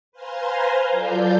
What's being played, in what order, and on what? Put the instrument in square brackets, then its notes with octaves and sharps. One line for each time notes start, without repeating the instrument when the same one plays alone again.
[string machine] B4 C5 F5 G#5 A#5 C6
F#3 F4 A4 D5 G6